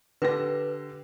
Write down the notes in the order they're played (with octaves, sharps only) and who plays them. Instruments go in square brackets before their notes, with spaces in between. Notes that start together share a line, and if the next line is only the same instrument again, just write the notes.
[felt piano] D3 G4 A#6 [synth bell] B4